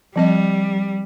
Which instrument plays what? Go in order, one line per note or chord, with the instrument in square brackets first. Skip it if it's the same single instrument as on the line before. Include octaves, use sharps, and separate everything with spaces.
[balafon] F3 C4 D#5 [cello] G3